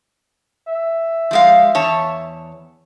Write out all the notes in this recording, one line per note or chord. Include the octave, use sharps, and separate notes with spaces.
E5
F3 G#3 F5
E2 C#5 A5